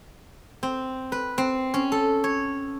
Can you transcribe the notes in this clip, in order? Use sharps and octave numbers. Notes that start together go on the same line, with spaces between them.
C4
B4
C4
C#4
A4
C#5